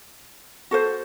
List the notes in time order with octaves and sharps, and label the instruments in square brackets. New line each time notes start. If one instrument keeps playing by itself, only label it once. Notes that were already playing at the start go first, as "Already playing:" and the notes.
[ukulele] F#4 A4 C5